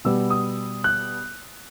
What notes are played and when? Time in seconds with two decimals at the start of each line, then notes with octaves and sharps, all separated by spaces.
0.05 B2 G3 B3 E6
0.30 D#6
0.84 F#6